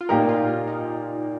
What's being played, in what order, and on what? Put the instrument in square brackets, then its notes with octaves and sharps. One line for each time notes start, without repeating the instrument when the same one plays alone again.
[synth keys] F4
[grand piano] A#2 A#3 G4 A#4 [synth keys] D#4
[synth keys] F4
F4
D#4